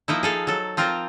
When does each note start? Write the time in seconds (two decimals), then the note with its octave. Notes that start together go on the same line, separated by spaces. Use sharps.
0.08 F3 A#3 D#4 E4
0.23 G#4 A4 F5
0.47 F#3 A4
0.77 F3 C4 F4 A#4